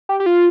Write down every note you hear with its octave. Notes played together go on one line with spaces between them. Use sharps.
G4
G4
F4